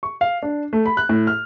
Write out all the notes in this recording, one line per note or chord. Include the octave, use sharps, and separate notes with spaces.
C#6
F5
D4
A3
B5
F#6
A2
F6